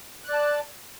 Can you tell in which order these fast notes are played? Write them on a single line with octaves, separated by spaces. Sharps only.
F#6 D5 A5